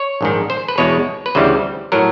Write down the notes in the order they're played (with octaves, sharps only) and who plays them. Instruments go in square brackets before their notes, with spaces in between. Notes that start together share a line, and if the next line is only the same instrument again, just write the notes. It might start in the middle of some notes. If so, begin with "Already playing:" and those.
Already playing: [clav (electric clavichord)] C#5
A#1 G#2 D#3
C5
B4
E2 B2 G#3 C#5
B4
D2 C#3 E3 G3 C5
A2 F#3 A#4